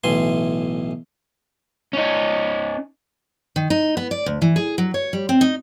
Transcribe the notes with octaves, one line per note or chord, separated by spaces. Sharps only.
B1 A2 E3 G#5 C6
C#4 D#4
D#3
D#4
B3
D5
D2
E3
G#4
F#3
C#5
G3
C4
D#4